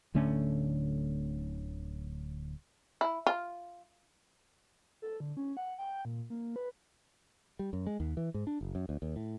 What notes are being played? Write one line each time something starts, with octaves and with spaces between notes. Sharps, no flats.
D1 D3 A3 C#4
E4
F4
A4
D3
C#4
F#5
G5
A#2
A#3
B4
G3
F#2
G#3
D#2
E3
G#2
D4
F#1
F#2
D2
D#2
A2